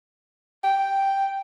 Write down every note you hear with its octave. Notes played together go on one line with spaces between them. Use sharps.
G5